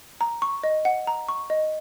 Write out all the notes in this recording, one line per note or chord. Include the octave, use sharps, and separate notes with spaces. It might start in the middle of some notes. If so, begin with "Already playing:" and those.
A#5
C#6
D#5
F#5
A#5
C#6
D#5